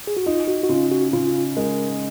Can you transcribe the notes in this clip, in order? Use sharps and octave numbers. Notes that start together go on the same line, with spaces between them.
G#4
F#4
D#4 F4
F#4
F#4
C#3 F4
F#4
C#3 F4
G#3 A#4